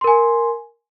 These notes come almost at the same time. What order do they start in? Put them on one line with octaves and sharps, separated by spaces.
C6 A#4 G#5